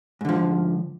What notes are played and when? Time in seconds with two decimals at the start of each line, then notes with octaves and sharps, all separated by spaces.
0.21 G#2
0.25 D3
0.29 F3